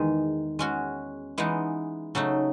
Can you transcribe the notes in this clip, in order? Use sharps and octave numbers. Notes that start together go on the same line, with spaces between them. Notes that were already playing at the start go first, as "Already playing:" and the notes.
Already playing: E2 D#3 G#3
G#3 C#4 F#4
E3 G#3 B3 D#4
C#3 F#3 A3 D#4